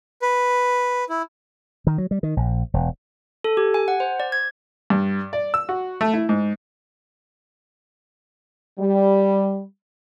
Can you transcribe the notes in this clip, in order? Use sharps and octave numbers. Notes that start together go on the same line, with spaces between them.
B4
E4
D#3
F#3
G3
D#3
A#1
E1
A4
G4
G#5
F#5
C5
D5
G#6
G2
D5
E6
F#4
A3
E4
G#2
G3